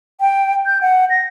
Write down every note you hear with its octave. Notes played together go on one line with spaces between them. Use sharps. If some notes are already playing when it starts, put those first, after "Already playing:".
G5
G6
F#5
A#6